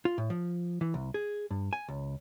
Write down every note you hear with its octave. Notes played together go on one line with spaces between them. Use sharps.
F4
A2
F3
E3
C2
G#4
G2
G#5
C#2